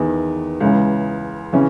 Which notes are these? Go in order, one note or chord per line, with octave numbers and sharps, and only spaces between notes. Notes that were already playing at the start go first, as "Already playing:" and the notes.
Already playing: E2 D#3 B3
C#2 C#3 E3
C#3 E3 C#4